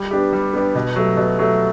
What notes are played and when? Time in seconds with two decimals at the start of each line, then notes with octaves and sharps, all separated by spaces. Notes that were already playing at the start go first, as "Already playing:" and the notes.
Already playing: G3
0.11 B3 D4 G4
0.33 G3
0.53 B3 D4 G4
0.75 B2
0.96 F#3 A3
1.17 B2
1.39 F#3 A3